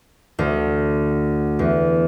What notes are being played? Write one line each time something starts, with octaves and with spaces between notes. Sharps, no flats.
D2
E2